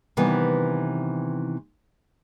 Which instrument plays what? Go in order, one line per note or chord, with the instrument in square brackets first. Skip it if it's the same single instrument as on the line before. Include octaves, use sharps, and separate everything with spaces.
[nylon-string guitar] C3 D#3 E3 G3 B3